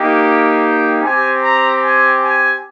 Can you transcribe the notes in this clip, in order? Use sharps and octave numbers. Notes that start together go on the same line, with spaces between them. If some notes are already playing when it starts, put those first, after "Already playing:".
Already playing: A#3 D#4 G4
G5
C4 G4 G#5
A#5
G#5
G#5